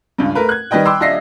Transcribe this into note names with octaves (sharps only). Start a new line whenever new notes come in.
C#2 G2
A3 A#4 B4
F#6 G#6
D#3 G3 B4 D#5 G5
G5 B5 C6 D6 E6
D#1 D4 D#5 E5 A#6 C7